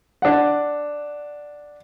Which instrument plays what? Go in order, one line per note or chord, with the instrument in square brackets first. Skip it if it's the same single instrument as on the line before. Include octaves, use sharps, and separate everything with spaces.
[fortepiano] D4 F#5